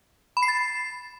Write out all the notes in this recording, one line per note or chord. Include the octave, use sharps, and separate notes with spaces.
B5
C7
A6